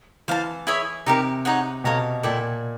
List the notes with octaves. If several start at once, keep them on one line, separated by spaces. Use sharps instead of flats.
E3 C5 F5 A5
E4 G#4 C#5 E5
C3 D#4 G4 A#4
D#4 G#4 C#5 F#5
B2 A4 C#5 F5 A#5
A#2 E4 A4 D5 G5